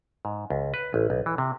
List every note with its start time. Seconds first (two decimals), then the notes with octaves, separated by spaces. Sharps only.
0.25 G#2
0.50 C#2
0.74 B4
0.94 A1
1.10 B1
1.26 E3
1.38 C3